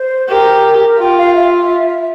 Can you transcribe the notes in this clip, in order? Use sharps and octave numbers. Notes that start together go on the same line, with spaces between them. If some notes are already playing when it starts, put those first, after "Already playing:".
Already playing: C5
G4 A#4
F4 G5
F5
E5